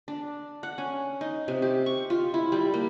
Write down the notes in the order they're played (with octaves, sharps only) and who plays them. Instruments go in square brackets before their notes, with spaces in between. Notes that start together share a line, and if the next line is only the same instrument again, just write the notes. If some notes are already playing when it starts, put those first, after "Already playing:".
[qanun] D4
F#5
C#4
D#4
C3
G4
C#6
F4
E4
G3
A#3